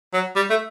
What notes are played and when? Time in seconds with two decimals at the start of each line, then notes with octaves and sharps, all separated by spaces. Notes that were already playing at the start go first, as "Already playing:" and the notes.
0.13 F#3
0.36 G3
0.50 A3